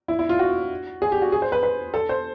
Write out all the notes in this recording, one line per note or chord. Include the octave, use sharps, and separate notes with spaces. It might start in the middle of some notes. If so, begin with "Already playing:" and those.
E4
E4
F4
F#4
G#4
G4
F#4
G#4
C5
B4
B4
A4
C5